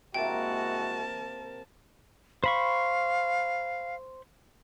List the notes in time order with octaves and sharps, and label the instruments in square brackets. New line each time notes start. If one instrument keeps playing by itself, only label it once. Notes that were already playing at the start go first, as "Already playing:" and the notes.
[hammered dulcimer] C3 A#3 [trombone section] G#3 E4 F#4 [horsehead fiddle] A#4 A5 [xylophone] G5
[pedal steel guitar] C5 B5 C#6 [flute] F5